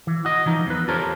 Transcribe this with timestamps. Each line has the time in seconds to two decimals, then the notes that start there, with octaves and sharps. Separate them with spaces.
0.07 E3
0.25 F#4 D#5
0.46 E3 F3 D#4
0.67 E2 B4
0.88 F4 G4 A4 A#4 C5 C#5